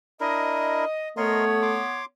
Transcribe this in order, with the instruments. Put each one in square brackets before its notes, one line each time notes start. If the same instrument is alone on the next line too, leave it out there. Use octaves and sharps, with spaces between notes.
[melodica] D4 E4 A#4 [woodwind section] D#5
[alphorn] A3 [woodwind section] B3 C#5 [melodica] A#4 D#5 C6
[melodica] C6 D6